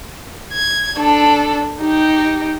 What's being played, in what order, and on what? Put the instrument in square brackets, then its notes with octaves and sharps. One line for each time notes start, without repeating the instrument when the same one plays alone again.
[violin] G#6
D4 A4
D#4 G4